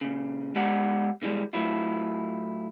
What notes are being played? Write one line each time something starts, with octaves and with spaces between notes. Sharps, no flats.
A#2 C#3
G#3 B3 G4 D5 F#5
B2 D3 E3 G3 G#3
A2 F#3 E4 F4